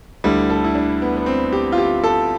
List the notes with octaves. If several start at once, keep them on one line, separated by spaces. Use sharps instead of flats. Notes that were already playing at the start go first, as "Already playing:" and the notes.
D2 D3 G3 E4
A4
E4
D4
B3
B3
C4
G4
F4
G4
A4